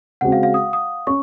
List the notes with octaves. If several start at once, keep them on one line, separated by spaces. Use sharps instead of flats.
C#3 G#3 C4 F#4 F#5
F5
F5
D#6
D#6
C#4 C#6